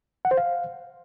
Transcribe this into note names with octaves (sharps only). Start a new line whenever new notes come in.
F#5
C5
F5